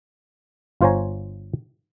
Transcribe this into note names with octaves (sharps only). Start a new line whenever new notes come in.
G1 F4 C5 C#5 G#5 A#5